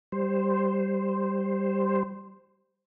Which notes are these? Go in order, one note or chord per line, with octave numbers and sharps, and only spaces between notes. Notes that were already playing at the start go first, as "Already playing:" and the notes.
G3 C5